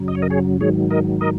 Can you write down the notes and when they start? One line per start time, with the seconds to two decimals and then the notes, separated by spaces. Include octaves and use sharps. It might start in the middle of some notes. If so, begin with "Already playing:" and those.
Already playing: F#2 C#3 F#3
0.08 D#5
0.15 C#5
0.22 A#4 D#5
0.30 G#4 C#5
0.60 G#2 D#3 F#3 G#4 C#5
0.91 A#4 D#5
1.21 A#4 D#5